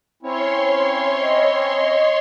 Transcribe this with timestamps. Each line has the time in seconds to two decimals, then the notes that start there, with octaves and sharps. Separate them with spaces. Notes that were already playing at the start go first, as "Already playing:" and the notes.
0.23 C4 C#4 E4 C#5 C6
1.22 D#5